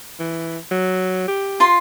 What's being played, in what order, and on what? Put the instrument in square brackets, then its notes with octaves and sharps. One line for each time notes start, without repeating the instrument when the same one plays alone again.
[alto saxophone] E3
F#3
G4
[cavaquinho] F4 C6